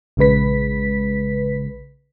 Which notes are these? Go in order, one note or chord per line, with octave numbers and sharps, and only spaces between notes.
A#1 C#3 G#3 B4 B6